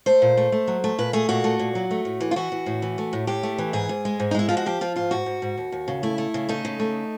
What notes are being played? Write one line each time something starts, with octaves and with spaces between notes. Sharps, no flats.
A3 C5
A#2
A3
A3
F#3
A3
A#2 B4
A3 G#4
A#2 F#4
A3
A#2
F#3
A3
A2
E3
F4
E3 F#4
E3
A2
E3
A3
A2
A2 G4
A3
E3
G#2 G#4
G#2
G#3
G#2
D#4
G#3 E4
F3 F4
F#4
F3 G4
F3 F4
G#2 F4
G#2 F#4
G#2
G#2
D#2
D#2
C#3
A3 E4
A3
C#3
A3 D#4
C#3
A3